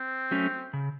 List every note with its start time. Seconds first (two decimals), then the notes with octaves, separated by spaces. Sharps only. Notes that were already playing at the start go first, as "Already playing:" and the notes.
Already playing: C4
0.31 F#3 A3 C#4
0.73 C#3